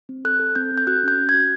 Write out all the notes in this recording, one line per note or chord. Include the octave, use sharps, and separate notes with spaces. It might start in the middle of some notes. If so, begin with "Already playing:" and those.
C4
A4 F#6
A4
C4 G6
A4
G6
F#4 F#6
C#4 G6
F#4
G#6
F#4